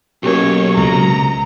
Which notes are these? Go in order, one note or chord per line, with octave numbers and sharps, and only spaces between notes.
B1 A#3 C#4 G4 C#5
C#2 C3 A#5